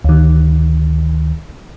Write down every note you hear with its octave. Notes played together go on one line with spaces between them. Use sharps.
D2 D#3